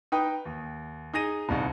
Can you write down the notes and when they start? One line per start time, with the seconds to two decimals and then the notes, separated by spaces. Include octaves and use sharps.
0.12 D#4 B4 G5 D#6
0.45 D#2
1.13 D#4 G#4 A#6 D#7
1.49 D#1 C2 D#4